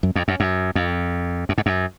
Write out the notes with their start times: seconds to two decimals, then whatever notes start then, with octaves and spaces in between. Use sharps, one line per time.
0.03 F#2
0.15 F2
0.28 F#2
0.40 F#2
0.75 F2
1.49 F#2
1.58 G#2
1.66 F#2